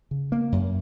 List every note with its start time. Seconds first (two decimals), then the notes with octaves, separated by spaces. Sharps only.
0.11 C#3
0.32 A#3
0.52 F#2